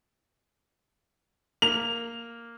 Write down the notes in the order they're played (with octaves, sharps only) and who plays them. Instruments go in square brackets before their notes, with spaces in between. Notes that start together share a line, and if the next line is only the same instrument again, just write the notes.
[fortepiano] A#3 [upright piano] F7